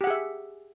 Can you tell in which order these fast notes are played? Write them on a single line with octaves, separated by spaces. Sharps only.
G4 F#5 G#4 E5